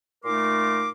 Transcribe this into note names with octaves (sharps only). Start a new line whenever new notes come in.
A#2 A3 D#4 A#4 C6 D6